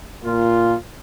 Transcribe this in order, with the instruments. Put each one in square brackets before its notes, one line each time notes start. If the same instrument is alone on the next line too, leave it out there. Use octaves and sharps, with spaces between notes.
[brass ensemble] A#2 A#3 F4